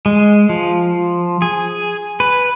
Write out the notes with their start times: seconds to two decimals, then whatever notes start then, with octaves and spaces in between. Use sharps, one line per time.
0.06 G#3
0.49 F3
1.42 G#4
2.20 B4